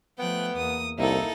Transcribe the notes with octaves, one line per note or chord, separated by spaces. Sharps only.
F3 A3 B3 G5 F#6
E2 A#3 D#6
C2 A#3 D#4 E4 A4